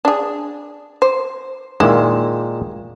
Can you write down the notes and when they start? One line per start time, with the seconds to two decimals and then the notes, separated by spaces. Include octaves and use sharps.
0.05 D4 G#4
1.02 C5
1.80 A#2 D#3 G#3 E4